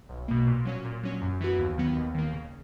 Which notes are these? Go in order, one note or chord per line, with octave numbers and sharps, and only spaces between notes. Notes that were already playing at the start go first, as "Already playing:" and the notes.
B1
B2 A#3
A#2
F#3 C#4
A#2
F#3 C#4
F#2
E3 B3 F#4
D#2
D#3 F#3 B3
D#2
D#3 A#3
C#3